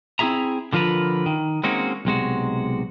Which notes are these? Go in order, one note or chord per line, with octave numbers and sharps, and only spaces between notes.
C4 E4 F#4 G#4 E5 A#5
D3 F3 F4 A#4 B4
D#3
G#3 A#3 C4 C#4 D#4 F#4
B1 C3 G#3 F#4